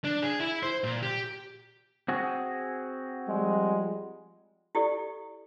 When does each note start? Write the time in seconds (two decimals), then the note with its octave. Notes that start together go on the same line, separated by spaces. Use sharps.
0.04 D4
0.23 G#4
0.40 E4
0.63 C5
0.84 A#2
1.02 G4
2.08 C4 F#4 G#4
3.28 F3 G3 G#3
4.75 E4 G4 A4 D5